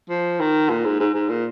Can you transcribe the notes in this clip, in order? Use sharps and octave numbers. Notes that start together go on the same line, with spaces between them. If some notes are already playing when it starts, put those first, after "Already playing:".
F3
D#3
A#2
G#2
G#2
G#2
A#2